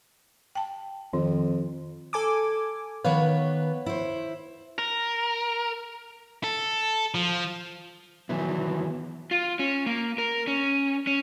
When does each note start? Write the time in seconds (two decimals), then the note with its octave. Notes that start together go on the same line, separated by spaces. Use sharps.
0.55 G5 A5
1.13 F2 D#3
2.13 A4 G#5 D6
3.04 D#3 B3 B4 C#5 F5
3.86 E4 C5
4.78 A#4
6.44 A4
7.14 F3
8.29 D#3 E3 F#3 B3 E4
9.31 F4
9.59 C#4
9.86 A#3
10.18 A#4
10.47 C#4
11.07 C#4